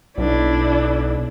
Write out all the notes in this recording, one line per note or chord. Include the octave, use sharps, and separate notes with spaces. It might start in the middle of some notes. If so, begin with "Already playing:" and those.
B1 D4 E4